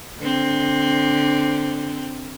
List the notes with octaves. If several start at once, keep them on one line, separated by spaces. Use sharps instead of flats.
D3 C4